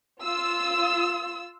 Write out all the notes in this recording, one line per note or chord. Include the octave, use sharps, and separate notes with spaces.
F4 E6